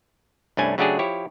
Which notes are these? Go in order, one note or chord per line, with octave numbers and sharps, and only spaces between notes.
C2 G2 A3 C#4 D4 G#5
C#3 F#3 A3 D4 G4 G#4
F3 E4 G4 C#5